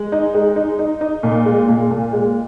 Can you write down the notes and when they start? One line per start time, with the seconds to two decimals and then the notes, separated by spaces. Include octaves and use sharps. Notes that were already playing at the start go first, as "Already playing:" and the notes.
Already playing: G#3
0.12 D#4
0.34 G#3
0.56 D#4
0.79 D#4
1.01 D#4
1.23 A#2
1.45 G#3
1.69 A#2
1.91 A#2
2.13 G#3